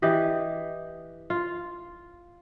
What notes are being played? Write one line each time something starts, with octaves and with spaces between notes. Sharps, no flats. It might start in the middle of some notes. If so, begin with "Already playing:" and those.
E3 G4 D#5
F4